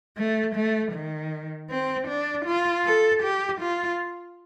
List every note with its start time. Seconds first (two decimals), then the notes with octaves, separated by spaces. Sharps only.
0.17 A3
0.55 A3
0.92 D#3
1.70 C4
2.08 D4
2.45 F4
2.85 A4
3.22 G4
3.61 F4